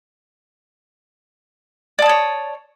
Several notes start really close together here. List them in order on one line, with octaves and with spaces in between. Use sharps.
D5 A5 D#6 C#5